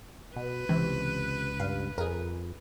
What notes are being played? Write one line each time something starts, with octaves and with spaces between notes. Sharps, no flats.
B2 B4
C#2 C3 E3
G2 F5
F2 G#4 A#4